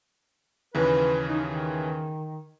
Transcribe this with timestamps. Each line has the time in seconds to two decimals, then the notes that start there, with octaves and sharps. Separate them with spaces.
0.75 D#2 C#3 E3 B4
1.28 D#4
1.47 D#3